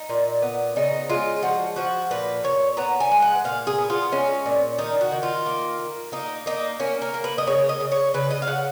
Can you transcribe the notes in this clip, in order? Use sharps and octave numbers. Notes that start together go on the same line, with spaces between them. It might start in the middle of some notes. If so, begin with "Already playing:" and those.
Already playing: D#4
A#2
B3
C#3 D#4
G#3 F4
F3 F#4
F3 F#4
A#2 B4
A#2 C#5
B3 A#5
G#5
G#3
F#5
A#2 F5
G#4
B3
F4
G#3 C#4
A#2
D#3 D#4
F#4
D#3
F4
A#3
A#3
A#3 D#4
A#3 D#4
A#3 C#4
A#4
A#3
B4
D#5
C#3 C#5
D#5
C#3
C#5
C#3 B4
D#5
F5
C#3 F#5